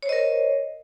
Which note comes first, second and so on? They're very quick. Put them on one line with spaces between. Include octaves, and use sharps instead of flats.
C#5 C5 D#5 A#4